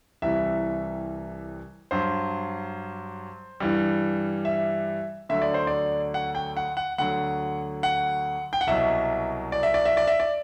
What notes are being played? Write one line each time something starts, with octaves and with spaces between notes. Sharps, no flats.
C2 C3 E3 G3 E5
G2 F#3 C5
G2 E3 G3
E5
D2 D3 F#3 E5
D5
C5
D5
F#5
G5
F#5
F#5
D2 D3 F#3 F#5
F#5
G5
F#5
C2 B2 F#3 E5
D5
E5
D5
E5
D5
E5
D5